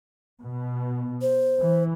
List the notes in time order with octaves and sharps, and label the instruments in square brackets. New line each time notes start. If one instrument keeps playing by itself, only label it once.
[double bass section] B2
[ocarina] C5
[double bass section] E3